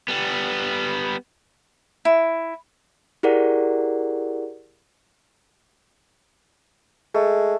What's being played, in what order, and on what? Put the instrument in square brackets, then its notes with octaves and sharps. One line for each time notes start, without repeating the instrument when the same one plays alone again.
[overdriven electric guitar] G3 B3
[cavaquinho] E4
[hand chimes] E4 G4 G#4 A#4 D5 F#5
[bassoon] G#3 [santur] A3